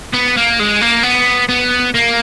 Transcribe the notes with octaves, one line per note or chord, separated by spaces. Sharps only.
B3
A#3
G#3
A#3
B3
B3
A#3